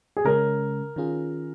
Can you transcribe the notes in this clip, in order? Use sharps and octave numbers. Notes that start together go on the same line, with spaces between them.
G#4
C#3 G#3 C#4 A#4
D#3 C#4 F4 G#4